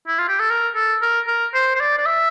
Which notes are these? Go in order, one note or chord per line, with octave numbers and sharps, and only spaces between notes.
E4
F4
G4
A4
A#4
A4
A#4
A#4
C5
C5
D5
D5
E5